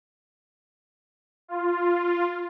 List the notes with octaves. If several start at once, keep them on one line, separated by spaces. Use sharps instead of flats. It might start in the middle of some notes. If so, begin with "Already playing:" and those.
F4